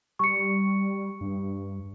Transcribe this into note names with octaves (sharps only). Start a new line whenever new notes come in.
G3 C#6 C#7
G2